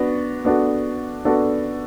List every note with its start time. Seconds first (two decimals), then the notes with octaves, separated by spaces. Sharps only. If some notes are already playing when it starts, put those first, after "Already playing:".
Already playing: B3 D4 F#4
0.45 B3 D4 F#4 A4
1.25 B3 D4 F#4 A4